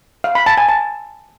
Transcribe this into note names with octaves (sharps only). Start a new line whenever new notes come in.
F5
B5
A5
G#5
A5